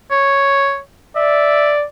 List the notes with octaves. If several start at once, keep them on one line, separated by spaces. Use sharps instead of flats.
C#5
D5 E5